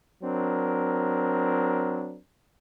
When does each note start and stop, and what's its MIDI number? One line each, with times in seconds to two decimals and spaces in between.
0.23 2.18 54
0.23 2.18 60
0.23 2.18 62
0.23 2.18 70